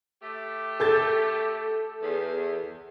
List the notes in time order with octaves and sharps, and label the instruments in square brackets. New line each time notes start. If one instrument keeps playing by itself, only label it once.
[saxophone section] A3 G4
[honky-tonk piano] A4 G6 A6
[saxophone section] E2